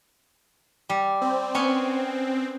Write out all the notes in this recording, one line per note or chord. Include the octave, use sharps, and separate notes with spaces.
G3
C4
B3 C#4 G#5